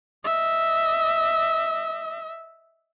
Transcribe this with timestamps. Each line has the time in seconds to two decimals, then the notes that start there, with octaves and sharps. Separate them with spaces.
0.24 D#5 E5